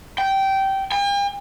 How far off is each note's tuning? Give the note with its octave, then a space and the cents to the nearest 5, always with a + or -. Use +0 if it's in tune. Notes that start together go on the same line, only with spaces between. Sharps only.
G5 -15
G5 +45